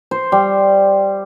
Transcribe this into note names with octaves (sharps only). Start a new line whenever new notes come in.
C5
G3